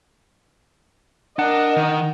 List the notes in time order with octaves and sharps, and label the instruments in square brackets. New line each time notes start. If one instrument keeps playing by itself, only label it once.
[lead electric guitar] D4 [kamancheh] A#4 D#5 [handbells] F#5
[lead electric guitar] D#3